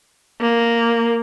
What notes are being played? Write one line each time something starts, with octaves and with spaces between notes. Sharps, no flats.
A#3